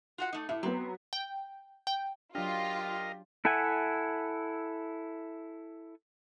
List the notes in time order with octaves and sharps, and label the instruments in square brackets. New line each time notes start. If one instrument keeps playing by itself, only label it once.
[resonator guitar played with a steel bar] F4 F#4 F#5
A3 D#4
[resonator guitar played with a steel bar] A2 [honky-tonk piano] E4
[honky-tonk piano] F#3 B3 [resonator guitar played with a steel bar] C4
[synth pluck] G5
G5
[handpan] F#3 D4 [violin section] F4 [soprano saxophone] G4 [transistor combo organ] A#4 D#5 F5
[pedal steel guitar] E4 A4 E5 F#5 G#5